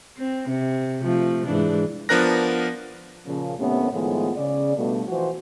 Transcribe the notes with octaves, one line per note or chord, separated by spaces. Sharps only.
C4
C3
C3 F3 A3
G#2 E3 D4
F3 B3 D4 A#4 F#6 A#6
A#2 C#3 F3
D#2 A2 C3 A3 B3 C#4
A2 D#3 F3 G#3 B3 F4
C#3 D5
G2 B2 A3
E3 F3 F#4 C5